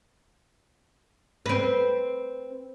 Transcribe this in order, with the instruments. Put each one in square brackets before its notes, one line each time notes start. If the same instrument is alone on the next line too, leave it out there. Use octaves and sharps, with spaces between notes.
[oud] C4 B4